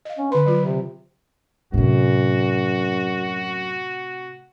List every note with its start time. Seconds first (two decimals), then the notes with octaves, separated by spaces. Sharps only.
0.05 D#5 F5
0.18 C#4
0.32 D3 B4 C6
0.46 F#3 F4
0.65 C3
1.74 F#2 A2 C3 F#4